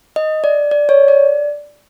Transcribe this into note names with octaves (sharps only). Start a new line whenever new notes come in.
D#5
D5
D5
C#5
D5